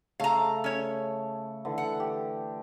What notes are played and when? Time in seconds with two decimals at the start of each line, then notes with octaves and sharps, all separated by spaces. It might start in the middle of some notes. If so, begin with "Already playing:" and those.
0.20 C#3 A3 F5 A#5
0.64 C#4 C#5
1.65 D3 E3
1.78 F#5
2.00 G4